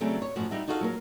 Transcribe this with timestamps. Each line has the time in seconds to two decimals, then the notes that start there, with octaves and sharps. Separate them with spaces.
0.01 C#3 F#3 G3 A3 C4
0.22 C#5
0.36 F#2 A2 F3 F#4
0.51 G3 D#4 F#4 E5
0.68 D#4 F4 F#4 A4 C5 F5
0.81 F#3 A#3 A#4